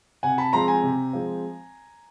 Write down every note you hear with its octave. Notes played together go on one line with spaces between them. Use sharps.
C3 F#5 G#5
A5 B5
F3 G#3 C4 A#5 C6
G#5 A#5
C3
F3 G#3 C4